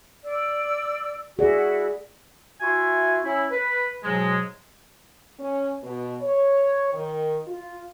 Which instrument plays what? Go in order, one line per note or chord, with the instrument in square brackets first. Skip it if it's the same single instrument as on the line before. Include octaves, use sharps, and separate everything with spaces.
[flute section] D5 E6
[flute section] E4 F#4 [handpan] G#4 D5
[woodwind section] E4 F#4 E5 G#5 C6
C#4 E4
B4
G#2 B2 F#3 G#3
[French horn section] C#4
B2
C#5
D#3
F4